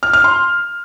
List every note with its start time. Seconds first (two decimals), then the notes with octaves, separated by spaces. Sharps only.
0.03 F6
0.13 F6
0.24 C6